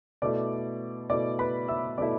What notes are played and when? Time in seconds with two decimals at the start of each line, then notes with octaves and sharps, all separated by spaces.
0.22 B2 A3 E4 D5 D6
1.10 B2 A3 E4 D5 D6
1.39 B4 B5
1.68 E5 E6
1.98 B2 A3 E4 D5 D6